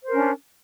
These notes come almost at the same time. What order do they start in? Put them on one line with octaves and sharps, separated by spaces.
C5 A#4 C#4 D4